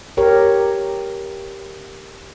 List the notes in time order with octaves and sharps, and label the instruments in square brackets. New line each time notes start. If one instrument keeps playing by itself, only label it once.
[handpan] G4 A#4 C#5